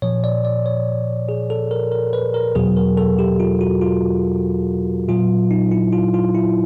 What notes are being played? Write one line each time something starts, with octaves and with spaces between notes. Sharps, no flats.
A#2 F3 C#5
D5
D5
C#5
G#4
A4
A#4
A#4
B4
A#4
E2 B2 F#3 G#4
A#4
A4
G4
F4
F#4
F4
A#2 F#3 F4
D#4
E4
F4
F4
E4